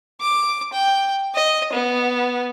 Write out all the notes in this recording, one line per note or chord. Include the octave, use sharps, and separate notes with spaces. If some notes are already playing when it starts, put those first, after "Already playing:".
D6
G5
D#5
B3